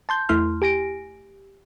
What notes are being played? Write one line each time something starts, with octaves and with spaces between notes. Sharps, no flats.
A5 C6 G6
E2 A3 E4 C6 F6
G4 G#5 A#6 D7